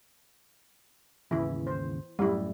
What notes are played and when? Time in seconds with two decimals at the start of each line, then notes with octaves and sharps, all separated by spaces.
1.31 G#1 D#2 C#3 E3 E4
1.67 C5
2.19 F#2 A2 G3 E4